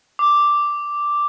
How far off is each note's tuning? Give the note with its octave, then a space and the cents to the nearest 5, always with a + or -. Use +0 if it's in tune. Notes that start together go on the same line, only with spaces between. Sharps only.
D6 +0